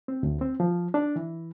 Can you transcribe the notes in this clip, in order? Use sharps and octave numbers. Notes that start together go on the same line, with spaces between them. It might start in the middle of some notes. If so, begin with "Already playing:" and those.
C4
D2
C4
F3
D4
E3